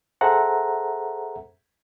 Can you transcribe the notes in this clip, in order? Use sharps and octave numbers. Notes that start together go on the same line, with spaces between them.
G#4 A4 C5 E5 F#5 A#5